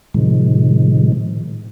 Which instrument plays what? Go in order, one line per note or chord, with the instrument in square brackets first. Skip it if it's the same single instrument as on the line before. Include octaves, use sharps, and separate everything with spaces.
[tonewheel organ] A2 C3 D#3 F3 G#3